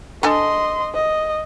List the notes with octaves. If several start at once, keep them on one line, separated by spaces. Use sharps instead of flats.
D4 A4 D#5 G#5 C6
D#5